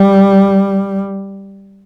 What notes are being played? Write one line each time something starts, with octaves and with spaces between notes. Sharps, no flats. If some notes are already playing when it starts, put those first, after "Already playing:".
Already playing: G3